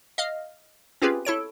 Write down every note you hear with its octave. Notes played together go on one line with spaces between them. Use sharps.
D#5 F5 F6
C4 C#4 F4 G4 G#4 B4
E4 A4 C#5 D7